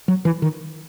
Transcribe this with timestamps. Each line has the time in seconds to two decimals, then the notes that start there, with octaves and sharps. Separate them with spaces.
0.08 F#3
0.25 E3
0.42 D#3